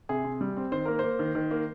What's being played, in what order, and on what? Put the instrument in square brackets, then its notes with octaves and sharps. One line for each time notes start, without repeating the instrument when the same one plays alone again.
[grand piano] C3 G#4
C3
G3
C4
D#3 C5
A#3 A#4
A#3 C5
D#3
D#3
A#3